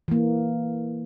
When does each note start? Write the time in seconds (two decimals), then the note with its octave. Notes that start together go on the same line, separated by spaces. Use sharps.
0.08 E3 A#3